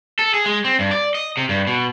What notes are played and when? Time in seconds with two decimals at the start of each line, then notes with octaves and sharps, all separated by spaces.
0.19 A4
0.34 G#4
0.46 G#3
0.65 C4
0.79 G2
0.91 D5
1.15 D#5
1.37 C3
1.49 G2
1.67 B2